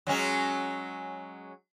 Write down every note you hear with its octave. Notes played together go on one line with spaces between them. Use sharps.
F#3 G#3 C#4